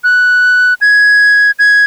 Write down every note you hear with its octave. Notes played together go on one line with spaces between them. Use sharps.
F#6
G#6
G#6